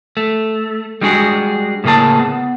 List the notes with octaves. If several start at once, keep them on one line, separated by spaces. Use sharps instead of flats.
A3
G3 G#3 D4 F#4 G#4
A2 C#3 A#3 G#4 A5
B3